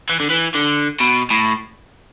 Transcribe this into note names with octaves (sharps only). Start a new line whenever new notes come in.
E3
D3
E3
D3
B2
A2